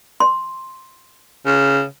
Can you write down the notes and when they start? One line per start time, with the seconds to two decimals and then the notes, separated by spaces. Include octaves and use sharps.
0.20 C6
1.46 C#3